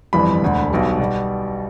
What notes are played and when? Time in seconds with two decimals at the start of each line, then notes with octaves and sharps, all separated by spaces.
0.13 G1 F2 E3 G3 B5
0.41 E1 D2 D3
0.71 B1 B2 G3
0.99 B2 G3